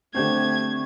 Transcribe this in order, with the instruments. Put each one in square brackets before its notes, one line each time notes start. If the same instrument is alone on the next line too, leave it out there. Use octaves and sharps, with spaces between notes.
[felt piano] D3 G4 C5 [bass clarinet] A3 [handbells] C4 G6 [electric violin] G#6